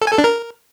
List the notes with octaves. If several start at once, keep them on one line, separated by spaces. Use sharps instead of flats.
A4
G#5
A4
D4
A#4